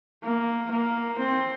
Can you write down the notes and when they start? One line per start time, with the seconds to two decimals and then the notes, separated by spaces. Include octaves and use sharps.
0.23 A#3
0.71 A#3
1.18 C4